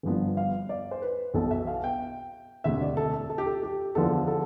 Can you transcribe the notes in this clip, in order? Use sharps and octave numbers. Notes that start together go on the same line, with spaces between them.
G1 G2 F3 B3
F5
D5
C5
B4
B1 B2 B3 A4
E5
F5
G5
E1 D2 C3 E5
D5
A4
A4
A4
G4
A4
G4
E2 D3 F3 B3 A4
A4